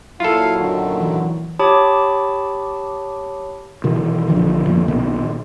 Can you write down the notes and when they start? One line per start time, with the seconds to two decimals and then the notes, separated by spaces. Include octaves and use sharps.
0.20 A#2 F#3 E4 F4 A4 F5
0.58 F#2 D3 D#3
1.00 E3
1.59 G4 C#5 A5 B5 D6 D#6
3.84 B2 D#3 E3
4.29 A#1 D3 D#3 F3
4.66 G1 F2 F3 A#3
4.88 B1 A#2 D#3